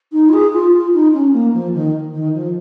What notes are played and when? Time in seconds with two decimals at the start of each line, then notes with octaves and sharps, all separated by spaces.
0.12 D#4
0.28 F4
0.33 G#4
0.52 F4
0.73 F4
0.93 D#4
1.13 C#4
1.33 A#3
1.53 F3
1.73 D#3
2.13 D#3
2.33 F3